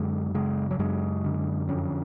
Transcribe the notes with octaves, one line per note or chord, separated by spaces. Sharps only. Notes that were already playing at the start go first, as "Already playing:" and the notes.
Already playing: F#2 D3 G#3
C#3 G#3
F#3
F#2 G#3
D3
F2 C#4